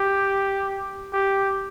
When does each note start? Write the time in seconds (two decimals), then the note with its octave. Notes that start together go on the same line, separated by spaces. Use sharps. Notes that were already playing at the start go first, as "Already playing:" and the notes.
Already playing: G4
1.13 G4